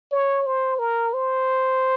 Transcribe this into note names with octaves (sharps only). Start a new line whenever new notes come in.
C#5
C5
A#4
C5